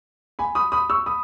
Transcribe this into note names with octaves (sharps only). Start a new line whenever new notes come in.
G#5 B5
B5 D#6
B5 D#6
C#6 E6
B5 D#6